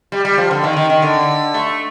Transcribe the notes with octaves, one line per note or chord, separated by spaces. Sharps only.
G3
G3
F3
D3
D#3
D#3
D#3
D3
A3